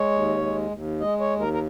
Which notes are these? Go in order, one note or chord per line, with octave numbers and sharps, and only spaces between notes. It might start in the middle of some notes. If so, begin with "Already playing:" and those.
Already playing: G#3 C#5
D#2
G#3
D#2
G#3 D#5
C#5
D#2
A#4
A#4